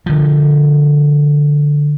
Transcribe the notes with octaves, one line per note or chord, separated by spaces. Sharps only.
D3 F3